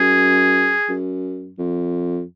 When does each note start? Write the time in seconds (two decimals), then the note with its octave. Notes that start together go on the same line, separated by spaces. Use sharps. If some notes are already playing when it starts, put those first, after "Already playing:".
Already playing: F#2 G#4
0.89 F#2
1.58 F2